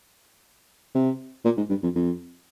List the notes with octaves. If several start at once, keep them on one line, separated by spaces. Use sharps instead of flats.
C3
A#2
G#2
G2
F2
F2